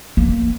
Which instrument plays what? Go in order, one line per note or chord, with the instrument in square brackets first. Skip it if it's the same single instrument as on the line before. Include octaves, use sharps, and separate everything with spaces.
[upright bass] A#3